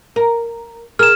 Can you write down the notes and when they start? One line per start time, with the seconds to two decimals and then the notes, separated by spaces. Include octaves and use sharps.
0.16 A#4
0.99 G#4 A#4 F6 E7